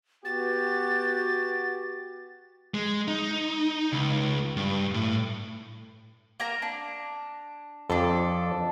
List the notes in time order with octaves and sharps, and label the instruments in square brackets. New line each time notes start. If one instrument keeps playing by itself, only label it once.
[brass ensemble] B3 F#4 G4 [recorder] A6
[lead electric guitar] G#3
D#4
C#2
G2
A2
[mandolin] A#3 A#4 A#5
D4
[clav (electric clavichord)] F2 [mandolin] D4 A4